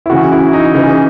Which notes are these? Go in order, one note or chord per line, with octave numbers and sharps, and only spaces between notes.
E4
C#3 E3 F#4
E4
D#4
C#3 E3 D#4